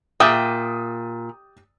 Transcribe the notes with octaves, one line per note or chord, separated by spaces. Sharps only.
A#2 G4 E5 G5 D#6 A6